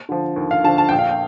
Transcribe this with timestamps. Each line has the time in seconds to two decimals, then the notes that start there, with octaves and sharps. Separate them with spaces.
0.09 D3 F3
0.36 D#2
0.51 F5
0.64 D3 F3 A5
0.78 A5
0.89 A#1 G5
0.99 F5
1.09 G5